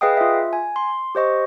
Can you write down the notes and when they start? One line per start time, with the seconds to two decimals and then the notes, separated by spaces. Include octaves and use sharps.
0.01 G#4 B4 D#5 F5 G5 D#6
0.17 F4 E5
0.53 G#5
0.76 C6
1.15 G4 C5 D#5 C#6